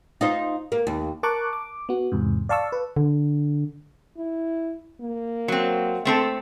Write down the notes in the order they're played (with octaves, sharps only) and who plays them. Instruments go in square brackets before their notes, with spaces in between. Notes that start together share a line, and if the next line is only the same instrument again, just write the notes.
[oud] D#4 F4 C5
A#3
D#2
[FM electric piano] A#4 A5 C#6 D6 F#6
D6
B3 F#4
E2 G#2 C3
D5 F5 A5 C#6 E6
B4
[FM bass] D3
[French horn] E4
A#3
[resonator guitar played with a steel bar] F#3 C4
A3 C4 A4